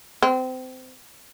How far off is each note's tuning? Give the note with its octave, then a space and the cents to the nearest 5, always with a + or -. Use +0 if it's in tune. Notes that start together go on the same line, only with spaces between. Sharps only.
C4 -25